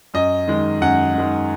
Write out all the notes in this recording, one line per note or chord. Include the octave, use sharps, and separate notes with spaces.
F#2 D#5
D#3 G#3
F#2 F#5
D#3 G#3